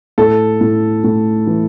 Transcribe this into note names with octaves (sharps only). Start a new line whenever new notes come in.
A2 A4
A2
A2
E3